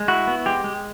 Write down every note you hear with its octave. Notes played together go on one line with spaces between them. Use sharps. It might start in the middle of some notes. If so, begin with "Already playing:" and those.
Already playing: G#3
E4 F#4
B3
G#3 G4
G#3